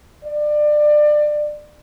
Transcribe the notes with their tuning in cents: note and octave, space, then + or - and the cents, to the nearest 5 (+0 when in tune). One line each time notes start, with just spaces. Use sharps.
D5 +25